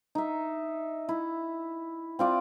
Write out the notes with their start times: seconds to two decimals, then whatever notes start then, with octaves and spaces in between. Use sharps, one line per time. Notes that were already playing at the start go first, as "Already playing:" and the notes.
0.15 D#4 E5
1.09 E4
2.19 C4 F4 D5